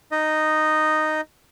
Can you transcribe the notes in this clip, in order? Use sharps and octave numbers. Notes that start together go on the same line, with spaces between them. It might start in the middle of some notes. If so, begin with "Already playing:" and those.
D#4 D#5